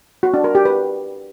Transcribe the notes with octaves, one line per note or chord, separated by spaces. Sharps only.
F#4
D4
A#4
G4
B4